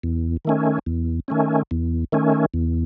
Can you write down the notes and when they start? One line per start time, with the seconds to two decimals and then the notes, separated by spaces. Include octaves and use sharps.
0.03 E2
0.45 D#3 A3 C#4
0.86 E2
1.28 D#3 A3 C#4
1.71 E2
2.12 D#3 A3 C#4
2.54 E2